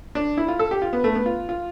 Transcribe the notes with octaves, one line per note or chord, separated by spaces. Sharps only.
D4
E4
F4
A4
G4
F4
B3
A3
B3
F4
F4